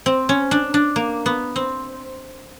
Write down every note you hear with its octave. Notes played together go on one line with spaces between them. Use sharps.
C4
C#4
D4
D4
A#3
B3
C4